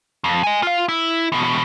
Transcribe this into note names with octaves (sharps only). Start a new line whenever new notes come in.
F2
D#5 G#5
F4 F5
E4
E2 B2